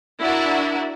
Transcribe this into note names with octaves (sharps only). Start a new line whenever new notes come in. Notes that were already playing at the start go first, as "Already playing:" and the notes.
D4 E4 F#4 A#4